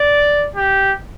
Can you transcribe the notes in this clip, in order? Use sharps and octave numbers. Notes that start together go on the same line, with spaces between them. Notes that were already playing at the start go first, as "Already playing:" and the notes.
Already playing: D5
G4